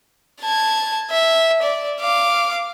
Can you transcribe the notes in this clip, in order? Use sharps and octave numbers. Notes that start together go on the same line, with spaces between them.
A5 G#6
E5
D5
F5 D6